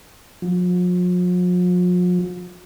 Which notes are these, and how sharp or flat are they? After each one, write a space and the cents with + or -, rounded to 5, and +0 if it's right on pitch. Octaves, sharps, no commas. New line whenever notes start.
F3 +45